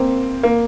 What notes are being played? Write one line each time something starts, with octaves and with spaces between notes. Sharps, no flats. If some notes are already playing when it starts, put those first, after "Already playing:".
Already playing: A#3 C4
A#3